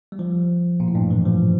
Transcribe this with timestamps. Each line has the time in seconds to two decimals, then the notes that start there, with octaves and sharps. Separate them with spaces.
0.12 G3
0.19 F3
0.80 A#2
0.88 A2
0.95 G2
1.11 E3
1.26 F3